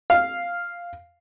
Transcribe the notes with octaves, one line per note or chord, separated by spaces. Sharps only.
F5